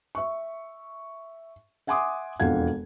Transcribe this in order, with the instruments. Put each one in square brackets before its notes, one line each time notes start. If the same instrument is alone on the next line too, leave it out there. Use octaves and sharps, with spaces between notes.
[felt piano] E5 C#6
E5 F#5 G#5 C6 D6 D#6
E1 F2 D4 F5 F#5 G#6